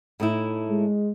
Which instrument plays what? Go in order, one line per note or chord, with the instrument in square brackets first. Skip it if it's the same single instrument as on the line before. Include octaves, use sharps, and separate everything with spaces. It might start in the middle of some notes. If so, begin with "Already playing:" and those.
[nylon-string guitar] A2 D#4 E4
[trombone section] G#3